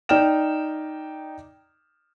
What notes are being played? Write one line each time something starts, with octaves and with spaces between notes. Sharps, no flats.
D#4 D5 G5 F6 E7